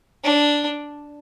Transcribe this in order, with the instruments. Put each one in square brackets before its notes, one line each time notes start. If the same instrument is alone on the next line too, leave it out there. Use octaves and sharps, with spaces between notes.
[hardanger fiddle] D4